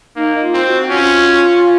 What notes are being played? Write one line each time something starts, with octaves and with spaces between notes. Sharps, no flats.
A#3 D#4
F4
C4
F#4
C#4 F4